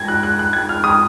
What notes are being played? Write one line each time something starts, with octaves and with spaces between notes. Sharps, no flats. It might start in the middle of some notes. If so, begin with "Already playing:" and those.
Already playing: G#6 A#6
F#6
F#6
F#6
G#6
F6
D#6